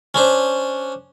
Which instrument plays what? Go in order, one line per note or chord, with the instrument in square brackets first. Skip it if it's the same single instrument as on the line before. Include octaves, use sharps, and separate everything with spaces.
[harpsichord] C#4 D4 C5